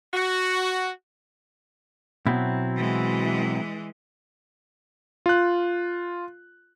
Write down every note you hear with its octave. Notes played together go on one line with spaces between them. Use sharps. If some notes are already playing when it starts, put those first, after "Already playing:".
F#4
B2 F#3 C4 E4
E3 G#3
F4 F#6